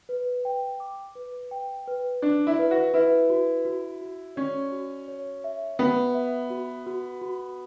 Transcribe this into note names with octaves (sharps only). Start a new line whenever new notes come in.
B4
G5
D6
B4
G5
B4
D4 D5
E4
B4
F#4
E4 B4
F#4
F#4
F#4
C#4 D5
F#4
C#5
E5
B3 F#4
E5
F#4
F#4
F#4